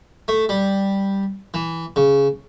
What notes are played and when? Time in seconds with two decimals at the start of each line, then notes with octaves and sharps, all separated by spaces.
0.28 A3
0.49 G3
1.54 E3
1.96 C#3